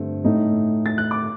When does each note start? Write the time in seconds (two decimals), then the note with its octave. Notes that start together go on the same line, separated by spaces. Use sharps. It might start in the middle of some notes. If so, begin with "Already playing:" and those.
Already playing: G2 D3 A3 C4
0.24 A2 A3 D#4
0.86 A6
0.98 F#6
1.11 D6